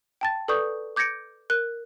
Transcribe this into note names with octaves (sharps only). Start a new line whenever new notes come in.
G5 A5 A6
A4 B4 D5 C#6 D#6 G6
D6 G6 G#6 A#6 C#7 D7
A#4 F#6